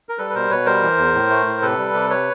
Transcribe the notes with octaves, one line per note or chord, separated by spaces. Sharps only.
A#4
G3 A4 B4
B4
B2 A#4 C5
B2 B4 C#5
G3 A#4 C5
E3
E2
A2
A3
A2
C3 A4 B4
G3
C3
B4 C#5